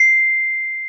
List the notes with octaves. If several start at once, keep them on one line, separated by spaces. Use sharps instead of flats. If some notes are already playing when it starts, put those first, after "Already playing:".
Already playing: C7